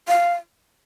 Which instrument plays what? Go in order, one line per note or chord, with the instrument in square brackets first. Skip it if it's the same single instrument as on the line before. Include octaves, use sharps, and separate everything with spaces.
[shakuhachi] F5